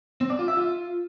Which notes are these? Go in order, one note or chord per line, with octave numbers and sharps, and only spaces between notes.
C4
D5
F4
E5
F4